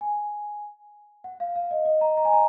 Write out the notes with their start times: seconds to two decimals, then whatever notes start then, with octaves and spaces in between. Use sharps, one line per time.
0.01 G#5
1.24 F#5
1.40 F5
1.56 F5
1.71 D#5
1.85 D#5
2.01 A#5
2.17 A#5
2.25 G#5
2.33 A#5